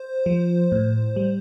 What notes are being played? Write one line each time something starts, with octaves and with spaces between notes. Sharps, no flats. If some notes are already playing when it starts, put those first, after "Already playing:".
Already playing: C5
F3
A2
G3